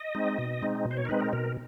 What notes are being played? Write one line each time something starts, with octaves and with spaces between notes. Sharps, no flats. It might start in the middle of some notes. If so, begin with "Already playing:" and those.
Already playing: D#5
G#3 C4 D#4
B2
G#3 C4 D#4
B2
C5
C#5
A#4
G#3 C4 D#4 B4
A#4
B2 A#4